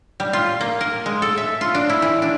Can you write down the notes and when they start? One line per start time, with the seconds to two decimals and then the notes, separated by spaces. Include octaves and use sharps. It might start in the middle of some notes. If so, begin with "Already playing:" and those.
0.20 G3
0.33 F4
0.61 A#3
0.81 A#4
1.06 G#3
1.22 A4
1.37 E5
1.61 F4
1.74 D4
1.89 E4
2.02 E3
2.22 D4